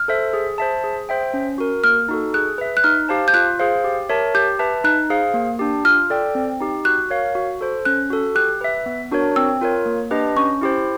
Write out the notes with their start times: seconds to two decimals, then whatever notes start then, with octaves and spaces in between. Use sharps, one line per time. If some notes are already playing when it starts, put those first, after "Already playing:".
Already playing: F6
0.08 A4 C5 E5
0.33 G#4
0.58 C5 E5 A5
0.84 G#4
1.09 C5 E5 G5
1.34 C#4
1.58 F#4 A#4
1.84 A#3 F6
2.09 D#4 F#4 A4
2.34 G#4 F#6
2.58 B4 E5
2.77 F#6
2.84 D#4 F6
3.09 G4 C5 F5 A5
3.28 G6
3.34 F4 F#6
3.59 G#4 C5 F5
3.84 G4
4.09 A#4 C#5 E5 A5
4.35 G4 G6
4.59 B4 E5 A5
4.84 D#4 F#6
5.10 G#4 C5 F5
5.34 A#3
5.59 D4 G4
5.84 F4 F6
6.10 A4 D5 G5
6.35 C4
6.60 D#4 G4
6.85 F#4 F#6
7.10 A#4 C#5 F5
7.35 F#4
7.61 A4 C5
7.85 C#4 F#6
8.10 F#4 A4
8.35 G4 F#6
8.61 B4 E5
8.86 B3
9.11 D4 F#4 A#4 C#5
9.36 C4 E6
9.61 F4 A#4 C#5
9.86 A#3
10.11 D4 G4 B4 D#5
10.36 C#4 C#6
10.61 E4 G4 C5